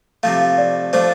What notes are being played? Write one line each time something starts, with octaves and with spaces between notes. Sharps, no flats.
C3 F3 A3 F5
F5
D5
F3 A3 D4 C5